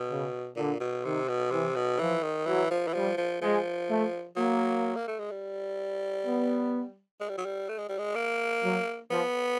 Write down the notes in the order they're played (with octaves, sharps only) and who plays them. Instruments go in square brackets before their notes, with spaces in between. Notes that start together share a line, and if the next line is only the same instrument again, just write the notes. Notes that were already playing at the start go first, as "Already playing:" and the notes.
Already playing: [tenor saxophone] B2
[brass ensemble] C#3
[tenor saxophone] A#2 [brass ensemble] D3
[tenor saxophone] B2
[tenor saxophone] C3 [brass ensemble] D#3
[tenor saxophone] B2
[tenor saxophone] C3 [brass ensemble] E3
[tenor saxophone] B2
[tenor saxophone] E3 [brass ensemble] F3
[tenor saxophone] D#3
[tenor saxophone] E3 [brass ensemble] F#3
[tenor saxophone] F3
E3
[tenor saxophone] F3 [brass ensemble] G3
[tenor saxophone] F3
[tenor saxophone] F3 [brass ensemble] G#3
[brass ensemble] A3
[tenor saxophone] F#3 [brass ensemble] A#3
[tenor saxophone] A#3
A3
G#3
G3
[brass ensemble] B3
[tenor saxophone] G#3
G3
F#3
G3
A3
G#3
G3
G#3
A#3
[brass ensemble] F#3
[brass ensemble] F3 [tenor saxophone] B3